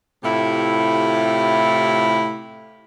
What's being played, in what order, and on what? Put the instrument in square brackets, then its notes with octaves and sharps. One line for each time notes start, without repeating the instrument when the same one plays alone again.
[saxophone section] A2 C3 A3 E4 F4 G4